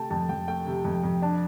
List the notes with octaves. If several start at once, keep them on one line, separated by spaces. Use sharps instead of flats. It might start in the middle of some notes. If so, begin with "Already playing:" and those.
Already playing: C3 A3 G5 A5
F2 A5
F2 G5
A3 G5
C3
F2
F2
D4 A5